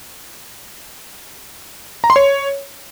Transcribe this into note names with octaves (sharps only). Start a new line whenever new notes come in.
A#5
C6
C#5